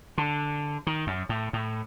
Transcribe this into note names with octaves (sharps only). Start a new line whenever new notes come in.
D3
D#3
F#2
A2
A2